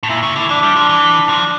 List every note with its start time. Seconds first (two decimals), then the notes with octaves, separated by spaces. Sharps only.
0.03 A2
0.09 A#2 E4
0.23 C#3
0.36 D3
0.41 E4
0.49 E3 D4
0.63 G3
0.76 F3
0.89 E3
1.29 F3